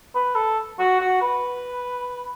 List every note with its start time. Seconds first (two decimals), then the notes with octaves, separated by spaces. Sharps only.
0.15 B4
0.35 A4
0.79 F#4
1.00 F#4
1.22 B4